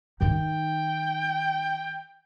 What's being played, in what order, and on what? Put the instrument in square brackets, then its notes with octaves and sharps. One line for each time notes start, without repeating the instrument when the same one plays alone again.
[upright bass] D#3 D#4 [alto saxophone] G5